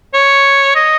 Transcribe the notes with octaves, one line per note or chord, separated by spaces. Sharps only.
C#5
D#5